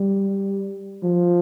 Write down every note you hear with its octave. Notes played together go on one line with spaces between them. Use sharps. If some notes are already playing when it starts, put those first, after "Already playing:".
Already playing: G3
F3